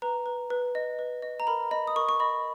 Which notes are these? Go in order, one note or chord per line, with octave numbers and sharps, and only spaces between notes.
B4 A#5
B4
B4
D#5
B4
D#5
A#5
A#4 B5
D#5 B5
D#6
A#4 C#6
C#6
D#5 B5